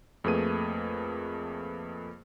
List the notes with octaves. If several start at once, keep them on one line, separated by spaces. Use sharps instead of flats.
F2 A3 A#3 G#4 B4 D#7